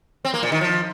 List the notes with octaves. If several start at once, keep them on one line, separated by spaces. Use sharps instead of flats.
C4
A#3
A#2
D#3
F3